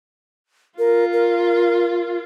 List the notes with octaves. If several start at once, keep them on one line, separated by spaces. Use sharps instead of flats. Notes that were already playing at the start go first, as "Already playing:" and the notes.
F4 A#4
A#4